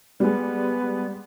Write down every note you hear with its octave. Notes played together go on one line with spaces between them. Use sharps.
G3 G#3 B3